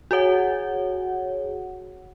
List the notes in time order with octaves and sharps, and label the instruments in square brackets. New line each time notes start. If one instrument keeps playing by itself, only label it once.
[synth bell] F#4 G#4 C#5 F#5